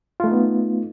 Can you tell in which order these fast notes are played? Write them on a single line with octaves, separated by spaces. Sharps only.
F4 A3 D#4 B3